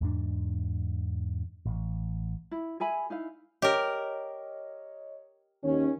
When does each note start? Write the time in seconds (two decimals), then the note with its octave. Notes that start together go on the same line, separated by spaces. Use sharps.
0.01 E2 G#2 D4
1.66 A1
2.51 E4
2.80 G#4 E5 G#5 B5
3.10 D#4 E4 F5
3.62 G4 A#4 C#5 D#5
5.64 D#2 C#4